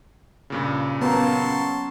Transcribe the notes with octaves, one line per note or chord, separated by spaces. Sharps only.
G2 A#2 C#3
F#3 A#3 B3 C#4 A5 C6 C#6